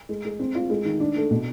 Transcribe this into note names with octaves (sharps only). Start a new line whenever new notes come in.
G#3
G#3
C4
F4
G#3
D#3
D4
A3
B2